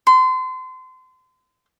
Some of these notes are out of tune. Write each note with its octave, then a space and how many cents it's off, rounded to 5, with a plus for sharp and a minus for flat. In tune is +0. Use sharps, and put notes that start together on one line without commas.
C6 -30